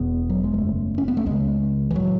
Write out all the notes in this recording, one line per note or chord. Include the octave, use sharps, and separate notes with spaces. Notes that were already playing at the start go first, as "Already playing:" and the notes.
Already playing: E1 E2 B2 B3
F#3
G#3
F#1 F#2 C#3 A3
C#4
B3
A3
C#2 C#3 G#3
E3
A2 F#3